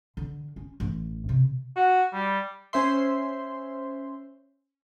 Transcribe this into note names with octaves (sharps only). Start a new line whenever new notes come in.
D3
C#4
A1
C3
F#4
G3
C#4 C5 E5 C6